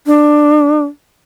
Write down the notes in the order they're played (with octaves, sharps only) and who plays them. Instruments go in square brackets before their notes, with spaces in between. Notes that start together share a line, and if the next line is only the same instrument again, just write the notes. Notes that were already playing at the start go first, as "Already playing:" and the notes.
[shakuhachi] D4